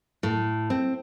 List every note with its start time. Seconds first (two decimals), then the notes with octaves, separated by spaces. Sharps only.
0.23 A2
0.70 C4